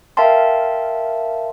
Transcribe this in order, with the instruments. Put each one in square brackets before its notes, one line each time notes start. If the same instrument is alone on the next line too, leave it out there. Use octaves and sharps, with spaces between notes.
[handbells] A#4 E5 F5 G5 A5 C6